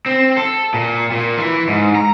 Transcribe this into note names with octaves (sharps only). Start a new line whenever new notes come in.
C4
A4
A#2
A#2
E3
G#2
A#5